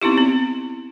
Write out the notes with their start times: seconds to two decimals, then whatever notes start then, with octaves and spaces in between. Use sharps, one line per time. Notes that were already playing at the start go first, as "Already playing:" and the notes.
0.02 B3 C4 D#4 E4 G4
0.18 C4